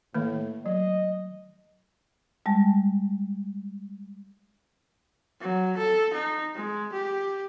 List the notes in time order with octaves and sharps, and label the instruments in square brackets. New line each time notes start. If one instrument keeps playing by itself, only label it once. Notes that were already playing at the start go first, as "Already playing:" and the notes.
[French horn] A2 [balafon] D#3 A3 A#3
[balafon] F#3 [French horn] D#5
[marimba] G3 G#3 A5
[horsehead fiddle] F#3
A4
D#4
G#3
G4